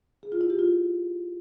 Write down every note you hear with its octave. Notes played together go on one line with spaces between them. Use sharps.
G#4
F4
E4
G4
F4